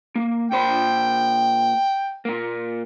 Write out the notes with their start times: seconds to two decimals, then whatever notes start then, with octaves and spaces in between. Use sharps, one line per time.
0.15 A#3
0.52 A#2 C5 G5 B5
2.25 A#2 A#3